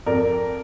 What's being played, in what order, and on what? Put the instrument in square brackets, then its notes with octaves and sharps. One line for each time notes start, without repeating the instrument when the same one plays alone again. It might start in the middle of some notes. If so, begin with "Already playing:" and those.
[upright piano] F2 A#4 D5